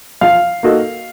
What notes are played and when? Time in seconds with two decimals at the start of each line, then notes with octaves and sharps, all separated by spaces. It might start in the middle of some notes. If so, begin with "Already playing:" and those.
0.21 F3 F5
0.63 A#3 D#4 F#4 A4